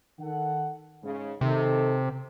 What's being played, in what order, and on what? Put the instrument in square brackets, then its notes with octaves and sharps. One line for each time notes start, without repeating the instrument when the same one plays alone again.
[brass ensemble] D#3 A4 F#5
G#2 C#3
[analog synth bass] C3 [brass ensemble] D#3 A4